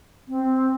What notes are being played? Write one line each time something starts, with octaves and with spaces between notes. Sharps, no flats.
C4